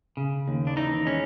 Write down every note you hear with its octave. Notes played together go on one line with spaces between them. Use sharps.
C#3
D#2
D4
E3 D#4
G#3 C#4